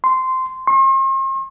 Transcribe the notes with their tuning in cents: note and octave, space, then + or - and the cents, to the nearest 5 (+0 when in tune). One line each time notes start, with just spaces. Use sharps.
C6 -10
C6 +45